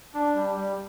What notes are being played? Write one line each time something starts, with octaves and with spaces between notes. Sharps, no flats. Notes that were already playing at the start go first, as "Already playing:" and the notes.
D4
G3
G3